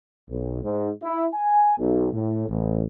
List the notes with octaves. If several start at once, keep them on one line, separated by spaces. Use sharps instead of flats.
B1
G#2
E4
G#5
B1
A2
A1